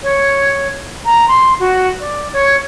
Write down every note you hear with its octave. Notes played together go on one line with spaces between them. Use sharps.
C#5
A#5
C6
F#4
D5
C#5